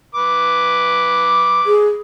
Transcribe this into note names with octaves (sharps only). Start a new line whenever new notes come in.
B4 D6
G#4